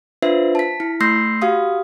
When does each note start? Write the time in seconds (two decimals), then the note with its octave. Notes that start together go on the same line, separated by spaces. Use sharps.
0.22 D4 F4 B4 C5 E5
0.55 A5 B6
0.80 E4
1.00 A3 C6 E6 G6 A#6 C7
1.42 F#4 G4 F5 D#6